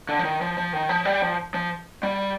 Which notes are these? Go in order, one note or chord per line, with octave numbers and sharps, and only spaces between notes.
D3
F3
D#3
F3
F3
D#3
F3
G3
F3
F3
G3